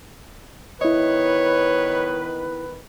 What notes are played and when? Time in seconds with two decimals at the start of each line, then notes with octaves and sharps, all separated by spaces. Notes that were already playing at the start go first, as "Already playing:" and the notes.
0.81 D#3 B3 E4 B4 C#5 D#5